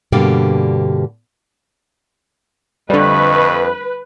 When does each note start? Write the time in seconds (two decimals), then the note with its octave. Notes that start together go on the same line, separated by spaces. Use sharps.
0.12 G2 B2 D3 A#3 G4
2.90 F2 D3 G3 A3 B4 D#5 C#6